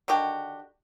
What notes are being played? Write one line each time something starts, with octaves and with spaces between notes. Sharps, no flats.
D3 D#3 F#4 G4